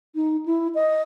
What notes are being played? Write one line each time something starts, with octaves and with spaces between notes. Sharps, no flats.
D#4
E4
D#5